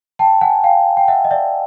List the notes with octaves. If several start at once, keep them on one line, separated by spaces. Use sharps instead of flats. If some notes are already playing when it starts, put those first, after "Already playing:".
G5 A5
F#5 G#5
F5 G5
G5
E5 F#5
D#5
D5 E5